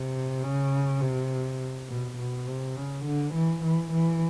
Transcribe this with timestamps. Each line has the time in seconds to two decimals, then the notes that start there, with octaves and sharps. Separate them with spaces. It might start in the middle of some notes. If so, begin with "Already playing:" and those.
Already playing: C3
0.43 C#3
1.01 C3
1.89 B2
2.18 B2
2.47 C3
2.76 C#3
3.06 D3
3.34 E3
3.64 E3
3.92 E3